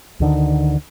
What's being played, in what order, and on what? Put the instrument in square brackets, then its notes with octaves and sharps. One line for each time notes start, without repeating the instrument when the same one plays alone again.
[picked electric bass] D2 D3 D#3